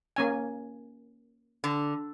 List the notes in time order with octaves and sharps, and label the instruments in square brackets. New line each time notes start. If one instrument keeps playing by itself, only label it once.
[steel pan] A#3 C#4 G#5
[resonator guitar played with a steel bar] D3